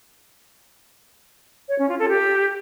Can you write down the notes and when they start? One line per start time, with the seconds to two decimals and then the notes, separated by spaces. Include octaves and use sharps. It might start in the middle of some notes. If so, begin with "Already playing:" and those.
1.69 C#5
1.79 C#4
1.89 F4
1.99 A4
2.09 G4